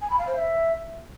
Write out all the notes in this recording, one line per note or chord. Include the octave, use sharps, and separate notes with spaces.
G#5
B5
F5
C5
E5